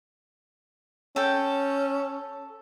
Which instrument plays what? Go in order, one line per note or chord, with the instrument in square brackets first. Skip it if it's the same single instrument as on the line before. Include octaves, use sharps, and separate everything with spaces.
[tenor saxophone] C#4 [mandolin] A4 G5